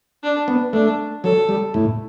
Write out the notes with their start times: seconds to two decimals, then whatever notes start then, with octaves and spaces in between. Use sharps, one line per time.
0.23 D4
0.48 B3
0.73 A3 D4
1.24 F#3 A4
1.49 G3
1.74 A2